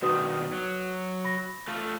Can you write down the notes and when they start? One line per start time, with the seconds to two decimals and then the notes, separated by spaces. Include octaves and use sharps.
0.02 G2 B2 D#3 F#4 B4 D#6
0.53 F#3
1.25 B5 A#6
1.67 A3 F4 A4